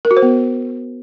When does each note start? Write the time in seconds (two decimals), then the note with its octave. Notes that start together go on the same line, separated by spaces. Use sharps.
0.05 A#4
0.11 F#4
0.17 C5
0.22 B3